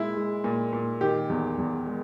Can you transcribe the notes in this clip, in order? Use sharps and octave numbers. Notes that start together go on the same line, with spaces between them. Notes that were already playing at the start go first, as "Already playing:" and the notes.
Already playing: A#2 G#3 E4
G#3
A#2
A#2
D#3 G4
E2
E2
G#3